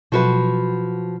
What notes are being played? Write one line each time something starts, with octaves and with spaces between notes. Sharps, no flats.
B2 F3 F#3 F#4 B4